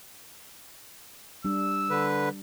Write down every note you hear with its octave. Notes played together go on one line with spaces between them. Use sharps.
G3 D4 E6
D3 B4